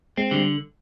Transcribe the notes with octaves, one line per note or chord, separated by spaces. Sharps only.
G#3 C4
D3 G3